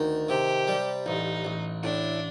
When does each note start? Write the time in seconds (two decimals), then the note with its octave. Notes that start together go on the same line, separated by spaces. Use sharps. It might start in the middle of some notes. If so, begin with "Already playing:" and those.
Already playing: D2 D#3
0.29 C3 G4
0.68 G3
1.06 A1 D#4
1.45 A1
1.83 A2 D4